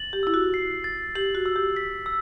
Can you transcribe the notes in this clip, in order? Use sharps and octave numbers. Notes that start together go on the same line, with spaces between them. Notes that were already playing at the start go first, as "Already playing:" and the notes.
Already playing: A6 F#7
G4
E4 E6
F#4
C7
A6
G4 F#7
F#4
E6
G4
B6
E6